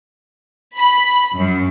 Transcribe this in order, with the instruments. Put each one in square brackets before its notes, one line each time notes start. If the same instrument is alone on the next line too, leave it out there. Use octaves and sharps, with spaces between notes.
[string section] B5
F#2